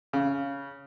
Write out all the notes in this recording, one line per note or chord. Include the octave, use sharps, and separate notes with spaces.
C#3